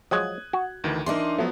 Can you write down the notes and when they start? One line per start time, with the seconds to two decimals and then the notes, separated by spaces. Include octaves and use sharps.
0.11 F3 F#3 G#3 D#6 F#6 G#6
0.53 F#4
0.84 D2 D#3 E3
1.06 E3 D4 D#4 A#4 C6
1.38 F3 F#3 A3 B3